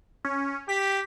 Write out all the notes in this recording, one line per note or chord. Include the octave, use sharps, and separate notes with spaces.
C#4
G4 B6